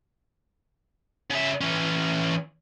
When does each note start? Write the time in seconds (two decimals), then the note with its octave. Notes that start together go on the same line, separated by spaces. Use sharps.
1.30 C#3 E5
1.61 E3 C#4